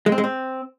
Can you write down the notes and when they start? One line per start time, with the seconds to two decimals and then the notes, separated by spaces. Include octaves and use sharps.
0.06 G#3
0.12 C4
0.18 G#3
0.24 C4